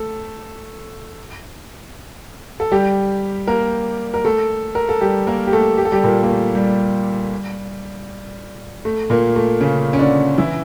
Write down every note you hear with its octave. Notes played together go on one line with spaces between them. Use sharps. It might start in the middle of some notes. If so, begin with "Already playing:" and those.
Already playing: A3 A4
A4
G3 G4
A#3 A#4
A#4
A3 A4
A#4
A4
G3 G4
A#3 A#4
G4
A3 A4
G4
A4
G3 G4
A#2 A#3
A#3
A3
G3
A3
A#2 A#3
A3
C#3 C#4
C#4
D3 D4
E3 E4